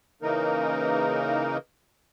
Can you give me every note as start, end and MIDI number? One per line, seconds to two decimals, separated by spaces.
0.22 1.57 49
0.22 1.57 52
0.22 1.57 58
0.22 1.57 63
0.22 1.57 70